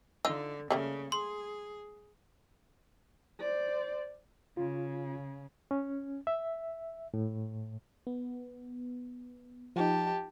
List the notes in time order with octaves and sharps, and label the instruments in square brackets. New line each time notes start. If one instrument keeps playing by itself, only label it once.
[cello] D3 [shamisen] D#4 F4 [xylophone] E6
[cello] C#3 [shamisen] G3 A3 A#3
[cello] G#4 [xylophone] C6
[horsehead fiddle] C5 D5
[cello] C#3 [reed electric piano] F4
[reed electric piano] C#4
E5
A2
[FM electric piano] B3
[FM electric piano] F3 D#4 [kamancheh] G4 A5